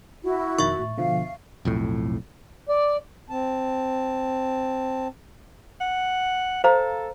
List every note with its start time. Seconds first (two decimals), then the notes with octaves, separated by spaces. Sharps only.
0.24 E4 F#4
0.59 F2 B2 D#3 E5 C#6
0.79 A2
0.98 B2 D3 F3 F5
1.65 B1 F2 A2
2.69 D5
3.30 C4 A5
5.81 F#5
6.64 A4 C5 F5 A#5